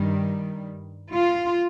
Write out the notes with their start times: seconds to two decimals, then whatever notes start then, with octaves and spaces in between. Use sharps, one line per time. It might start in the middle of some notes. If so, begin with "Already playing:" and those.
Already playing: G2 D#3 G3
1.14 F4